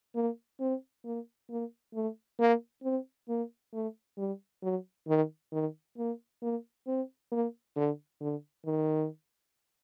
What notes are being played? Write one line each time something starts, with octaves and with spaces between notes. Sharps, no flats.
A#3
C4
A#3
A#3
A3
A#3
C4
A#3
A3
G3
F#3
D#3
D#3
A#3
A#3
C4
A#3
D3
D3
D#3